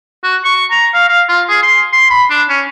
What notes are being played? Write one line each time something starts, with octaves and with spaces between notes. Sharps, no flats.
F#4
C#6
A#5
F5
F5
F4
G#4
C6
C6
B5
D4
C#4